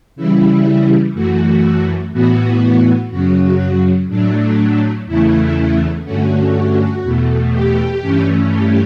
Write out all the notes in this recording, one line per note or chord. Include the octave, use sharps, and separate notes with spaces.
C#3 E3 G3 E4
F#2 E3 A3 F#4
A2 E3 B3 F#4
F#2 C#3 F#3 F#4
A2 F#3 A3 D4
E2 C#3 E3 A3 E4
G2 D3 A3 C#4 F#4
E2 B2 A3
G4
G2 E3 A3 C#4
G4